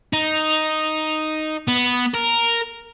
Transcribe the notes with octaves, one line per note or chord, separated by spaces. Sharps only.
D#4
B3
A#4